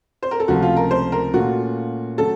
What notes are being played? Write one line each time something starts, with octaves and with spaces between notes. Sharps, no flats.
C5
A#4
A4
C#2 C3 F3 A3 F#4
F4
A#4
C5
A#4
A#2 A3 C#4 F4 F#4
C#3 F#3 A3 A4